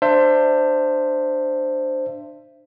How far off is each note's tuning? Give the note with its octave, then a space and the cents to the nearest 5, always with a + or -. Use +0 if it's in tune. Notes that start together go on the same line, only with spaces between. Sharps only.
D4 +20 C5 +0 E5 +30